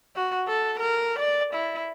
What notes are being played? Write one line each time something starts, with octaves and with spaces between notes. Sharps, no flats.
F#4
A4
A#4
D5
E4